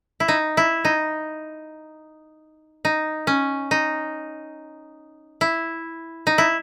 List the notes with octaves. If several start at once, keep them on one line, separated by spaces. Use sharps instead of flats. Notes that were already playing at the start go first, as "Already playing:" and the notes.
E4
D#4
E4
D#4
D#4
C#4
D#4
E4
D#4
E4